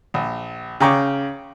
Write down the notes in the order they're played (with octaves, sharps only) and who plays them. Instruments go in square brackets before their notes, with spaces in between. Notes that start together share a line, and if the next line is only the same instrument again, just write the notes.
[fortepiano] A#1
C#3 G5 A#5 C#6 D6